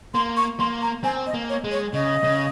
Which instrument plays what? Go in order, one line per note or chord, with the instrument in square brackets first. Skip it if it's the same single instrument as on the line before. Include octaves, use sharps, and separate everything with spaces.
[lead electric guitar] A#3 [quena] C6
[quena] C#6
[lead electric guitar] A#3 [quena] C6
[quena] A#5
[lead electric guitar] C4 [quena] G#5
[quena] D#5
[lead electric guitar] A#3
[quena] C#5
[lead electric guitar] G#3
[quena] C#5
[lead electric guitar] C#3 [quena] D#5
[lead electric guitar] C#3